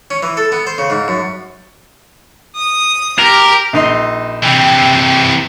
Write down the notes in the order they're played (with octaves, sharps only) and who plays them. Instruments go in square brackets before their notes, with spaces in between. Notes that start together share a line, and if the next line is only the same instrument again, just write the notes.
[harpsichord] C#4
E3
A4
B3
C5
C#3
G#2
F#2
[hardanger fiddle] D#6
[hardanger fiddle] G4 [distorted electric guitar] A#4
[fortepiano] A#1 D#4 C6
[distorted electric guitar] C3 E3 [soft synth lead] G5